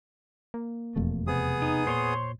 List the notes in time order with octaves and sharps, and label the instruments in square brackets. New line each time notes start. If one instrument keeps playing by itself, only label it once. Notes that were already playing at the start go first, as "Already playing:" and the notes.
[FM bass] A#3
[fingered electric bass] E1 F2 A3
[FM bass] C3 [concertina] B3 G#4 D#6
[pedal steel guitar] D#4
[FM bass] A#2 [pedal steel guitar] C5 C#5 C6